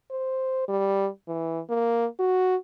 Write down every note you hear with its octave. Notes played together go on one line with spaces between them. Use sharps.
C5
G3
E3
A#3
F#4